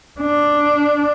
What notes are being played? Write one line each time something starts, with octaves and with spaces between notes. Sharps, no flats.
D4